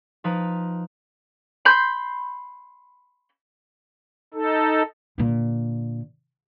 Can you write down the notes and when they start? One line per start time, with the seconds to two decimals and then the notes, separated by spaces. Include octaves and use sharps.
0.24 F3 D#4 B4 A#5
1.65 B5 C6 G6
4.34 D#4 A4
5.18 A#2 D3